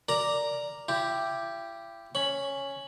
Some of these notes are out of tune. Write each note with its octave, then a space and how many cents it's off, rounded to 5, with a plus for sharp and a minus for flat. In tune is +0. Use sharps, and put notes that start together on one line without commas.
A#4 +0 D5 +0 A#5 +0
E4 +40 G4 +0
C#4 +0 B5 +5